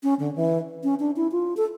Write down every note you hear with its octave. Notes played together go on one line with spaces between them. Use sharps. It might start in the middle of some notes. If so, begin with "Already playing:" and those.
C#4
D3
E3
C#4
D4
E4
F4
A4